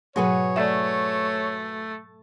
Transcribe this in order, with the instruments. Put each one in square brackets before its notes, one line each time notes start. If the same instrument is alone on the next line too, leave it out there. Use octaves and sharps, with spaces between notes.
[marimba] G#2 B2 F#3 [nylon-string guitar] F#4 G#4 B4 [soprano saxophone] C#5
[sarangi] A3 [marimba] D5 E5